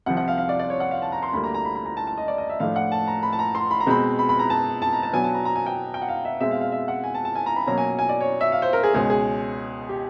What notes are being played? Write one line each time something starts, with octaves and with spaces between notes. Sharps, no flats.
C2 C3 F3 F#5
F#5
F5
F5
D5
D5
C#5
F#5
F5
A5
A#5
C6
D2 D3 G3 A#3 B5
A#5
A#5
B5
B5
A#5
A5
A5
D#5
D5
D#5
E5
A2 F3 A3 D4 F5
F#5
A5
A#5
B5
A5
A#5
C6
B5
A#5
B2 G#3 C4 B5
B5
B5
A#5
A5
A5
A#5
A5
B2 F#3 B3 D4 G#5
A5
A#5
A#5
G#5
G5
G5
F#5
F5
E5
B2 G#3 C4 E5
F5
F5
E5
F#5
G#5
A5
A5
G#5
A#5
B5
B2 F#3 A#3 C#4 A#5
G#5
G#5
D5
C#5
E5
F5
C5
A#4
G#4
C#2 B2 G#3 C#4 G#4
G#4
G4